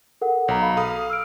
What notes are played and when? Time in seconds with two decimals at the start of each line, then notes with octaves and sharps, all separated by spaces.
0.21 A4 A#4 F#5
0.48 B1 C#5 A#5
0.62 F5 B5
0.77 A4 F5 D#6
1.10 E6 F6 D7